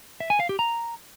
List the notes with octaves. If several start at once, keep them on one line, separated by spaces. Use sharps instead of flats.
E5
G#5
F5
G4
A#5